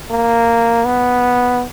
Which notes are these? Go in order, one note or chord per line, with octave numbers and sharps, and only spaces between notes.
A#3
B3